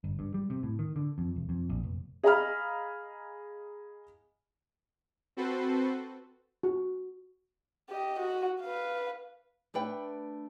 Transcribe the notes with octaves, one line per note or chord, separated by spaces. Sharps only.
G1
G2
G3
C3
A2
D#3
D3
F2
E1
F2
A#1
F1
G#4 D#5 F5 A#5 B5 F6
C4 F#4 A4 B4 C5
F#4
G4 D#5
F#4
B4 F5
A3 D4 B4 G5